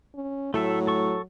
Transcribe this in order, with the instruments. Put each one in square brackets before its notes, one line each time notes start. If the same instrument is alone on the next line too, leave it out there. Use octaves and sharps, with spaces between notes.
[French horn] C#4
[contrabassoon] A2 [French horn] F#3 [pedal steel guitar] A3 A4 E5
[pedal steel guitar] A4 C#6